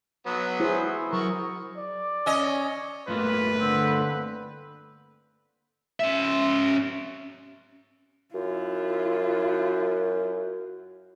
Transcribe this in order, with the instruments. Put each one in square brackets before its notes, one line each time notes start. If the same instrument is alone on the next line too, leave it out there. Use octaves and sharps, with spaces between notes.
[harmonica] F#3 B3
[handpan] E4 G#4 C5
[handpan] F#3 [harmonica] A#4 C#6
[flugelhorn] D5
[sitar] C#4 D#5
[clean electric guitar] G2 A3 A#3 [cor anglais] F4 [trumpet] B4
[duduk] D3 [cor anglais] C4
[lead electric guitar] C#4 E5
[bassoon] F#2 [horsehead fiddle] E4 F4